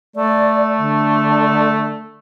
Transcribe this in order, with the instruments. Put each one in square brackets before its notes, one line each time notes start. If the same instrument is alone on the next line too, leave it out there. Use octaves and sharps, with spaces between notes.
[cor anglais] A3 [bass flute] D5
[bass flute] D3